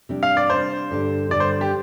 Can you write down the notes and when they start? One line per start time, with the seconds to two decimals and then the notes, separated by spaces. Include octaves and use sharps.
0.09 C3 G3 D4
0.23 F5
0.37 D5
0.50 C3 G3 D4 C5
0.91 G2 D3 G3 D4
1.30 G2 D3 G3 D4 D5
1.40 C5
1.61 G4